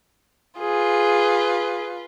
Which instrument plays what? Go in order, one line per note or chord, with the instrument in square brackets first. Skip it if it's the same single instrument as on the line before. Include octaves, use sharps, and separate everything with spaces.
[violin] F4 B4 [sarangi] G#4